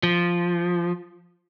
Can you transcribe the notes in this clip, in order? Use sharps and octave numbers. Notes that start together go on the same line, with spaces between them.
F3